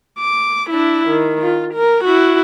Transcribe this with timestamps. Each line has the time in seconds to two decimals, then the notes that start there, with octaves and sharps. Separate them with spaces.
0.19 D6
0.70 D4 E4
1.09 D#3
1.42 F4
1.74 A#4
2.04 E4 F#4